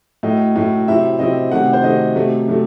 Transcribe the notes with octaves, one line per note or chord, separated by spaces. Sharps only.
A2 F#3 A3 D#5
A2 F#3 A3
C3 F#3 C4 E4 E5
C3 F#3 C4 E4 D#5
C3 D#3 F#3 A3 F#5
C5
C3 D#3 F#3 A3 D#5
C3 F#3 A3
C3 F#3 A3